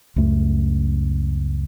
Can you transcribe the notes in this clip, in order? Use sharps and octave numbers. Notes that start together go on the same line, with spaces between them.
C#2 F#2 A3